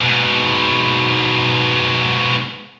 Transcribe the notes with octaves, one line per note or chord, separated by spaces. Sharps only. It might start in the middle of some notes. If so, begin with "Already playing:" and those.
G#2 B2